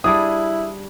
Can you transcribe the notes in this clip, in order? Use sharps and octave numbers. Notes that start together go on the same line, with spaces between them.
G3 D4 E4 G#4 D#6